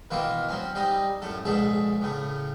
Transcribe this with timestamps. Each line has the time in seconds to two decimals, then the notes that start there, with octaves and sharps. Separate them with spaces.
0.11 B2 D#3 E3 A#3 E4 F4
0.49 F#3 C4 C#4
0.75 G3 C4 D#4 D#5
1.22 F#2 A2 A3 A4
1.45 A#1 G#2 B2 G#4 A4 E5
2.01 A2 C#3 A3